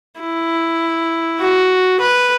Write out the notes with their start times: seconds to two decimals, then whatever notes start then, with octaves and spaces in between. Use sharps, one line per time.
0.20 E4
1.41 F#4
2.01 B4